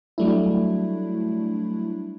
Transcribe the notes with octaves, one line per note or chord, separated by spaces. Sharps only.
F#3 G3 A3 D4 E4